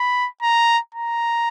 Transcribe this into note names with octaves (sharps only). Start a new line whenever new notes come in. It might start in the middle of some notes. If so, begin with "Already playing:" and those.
Already playing: B5
A#5
A#5